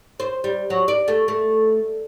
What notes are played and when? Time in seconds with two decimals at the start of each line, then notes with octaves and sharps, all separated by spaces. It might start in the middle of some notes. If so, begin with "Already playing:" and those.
0.20 C5
0.44 G3
0.70 F#3
0.88 D5
1.08 A3
1.28 A3